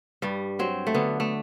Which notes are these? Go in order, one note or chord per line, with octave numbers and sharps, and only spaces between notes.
G2 G3
F#3 C4
A3
D3 B3
A3